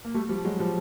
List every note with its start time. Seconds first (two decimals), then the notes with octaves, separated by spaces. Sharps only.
0.05 A#3
0.14 G3 A3
0.29 F3 G3
0.45 F#3 G#3
0.59 F3 G3